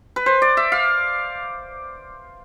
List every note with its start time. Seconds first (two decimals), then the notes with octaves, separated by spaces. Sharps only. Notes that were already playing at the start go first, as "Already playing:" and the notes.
0.16 B4
0.26 C5
0.42 D5
0.57 E5
0.72 F5